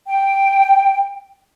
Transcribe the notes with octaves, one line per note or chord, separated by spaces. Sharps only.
G5